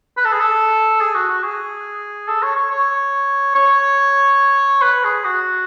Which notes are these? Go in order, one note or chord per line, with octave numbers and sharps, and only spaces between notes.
B4
A4
G#4
A4
G#4
F#4
F#4
G#4
A4
C#5
C#5
C#5
C#5
B4
G#4
F#4